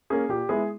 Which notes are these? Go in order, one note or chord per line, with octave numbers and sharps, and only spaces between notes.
A#3 C#4 G#4
A#2 G4
G#3 B3 E4 G#4